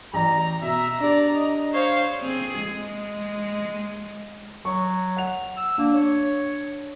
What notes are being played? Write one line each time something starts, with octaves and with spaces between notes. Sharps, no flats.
A1 D5 A#5
B2 E5 A#5
D4 G4 D5
D#5
C5 C#5 F5
C4 G#4
G#3
F#3 C#6
F#5 F7
E6
A#3 D4
C#5